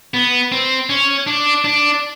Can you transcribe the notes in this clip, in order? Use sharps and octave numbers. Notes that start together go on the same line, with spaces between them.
B3
C4
C#4
D4
D4